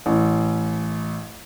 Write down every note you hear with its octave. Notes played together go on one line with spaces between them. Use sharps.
A1